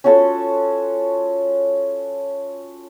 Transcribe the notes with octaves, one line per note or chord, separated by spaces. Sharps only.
C#4 F4 F#4 A4